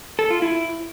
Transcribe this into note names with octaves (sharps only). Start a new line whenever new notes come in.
A4
F4
E4